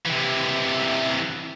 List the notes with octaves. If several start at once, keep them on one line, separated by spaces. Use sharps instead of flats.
C3 E3